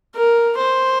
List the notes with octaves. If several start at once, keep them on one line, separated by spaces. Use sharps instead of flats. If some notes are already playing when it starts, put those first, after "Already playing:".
A#4
C5